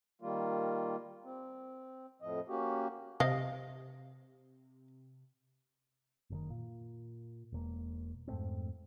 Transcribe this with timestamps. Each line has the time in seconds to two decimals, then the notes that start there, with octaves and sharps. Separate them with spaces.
0.22 D#3 G3 A#3 F4
1.24 C4
2.21 F2 A2 F3 D#5
2.48 A#3 C#4 F#4 G4
3.20 C3 D#5 F5
6.30 F#1 C3 D#3
6.50 A#2
7.52 E1 A#3
8.28 F2 G#2 A3 C4